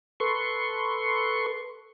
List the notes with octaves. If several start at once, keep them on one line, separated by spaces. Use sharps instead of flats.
A4 B4 C6 C#6